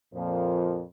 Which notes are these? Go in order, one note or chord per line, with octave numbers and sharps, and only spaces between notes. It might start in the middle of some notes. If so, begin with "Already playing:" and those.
F2 A#2 F3